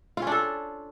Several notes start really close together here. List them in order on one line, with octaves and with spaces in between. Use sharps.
F4 C#4 D4 A4